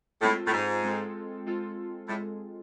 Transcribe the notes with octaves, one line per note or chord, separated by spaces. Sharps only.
A2 G#3 C4 F4 A4
A2
G#2
G#3 C4 F4 A4
G#3 C4 F4 A4
A2 G#3